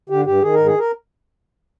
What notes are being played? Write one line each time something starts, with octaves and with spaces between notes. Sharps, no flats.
D3 G4
G2 G4
D#3 G#4
G#2 A#4
G#4
A#4